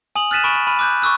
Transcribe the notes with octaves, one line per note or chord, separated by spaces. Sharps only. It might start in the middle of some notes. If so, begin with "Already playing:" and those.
G#5 D#6 F7 F#7
F6 F#6 A6 B6 D#7 E7
G#5 B5 C#6 D7 E7
B5 F6 D#7
D6 F#6 G6
C#6 D6 E6 F#6